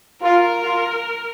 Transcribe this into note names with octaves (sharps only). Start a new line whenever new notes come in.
F4 A#4
F4